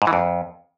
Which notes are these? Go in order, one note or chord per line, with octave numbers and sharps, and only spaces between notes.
G#2
E3
F2